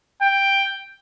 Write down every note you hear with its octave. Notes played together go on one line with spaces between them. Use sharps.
G5